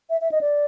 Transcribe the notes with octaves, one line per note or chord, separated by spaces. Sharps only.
E5
E5
D#5
D5